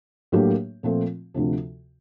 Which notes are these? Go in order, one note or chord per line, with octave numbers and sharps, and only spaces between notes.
A2 F#3 A#3 D4 G4
A#2 F3 A3 C4
D2 C3 F3